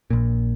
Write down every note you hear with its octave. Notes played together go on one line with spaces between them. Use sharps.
A#1 A#2